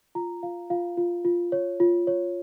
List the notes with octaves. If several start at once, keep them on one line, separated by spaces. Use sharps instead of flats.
F4 A#5
F4 F5
F4 F5
F4
F4
C#5
F4
C#5